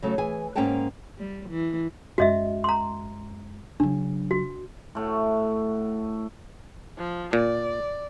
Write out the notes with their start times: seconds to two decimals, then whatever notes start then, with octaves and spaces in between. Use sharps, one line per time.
0.02 C#3 F#3 A3
0.18 E3 G#4 G#5
0.56 G#2 A#3 C#4 F#5 G5 A5
1.18 G3
1.49 E3
2.18 F#2 G#3 F#4 D#5 E5
2.64 A#5 C6
3.80 C#3 F#3 D4
4.31 F#4
4.95 A2 A3 F#4
6.97 F3
7.33 A#2 D5